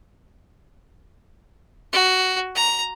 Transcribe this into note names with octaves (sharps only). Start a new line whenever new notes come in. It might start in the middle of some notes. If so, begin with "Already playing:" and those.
F#4
A#5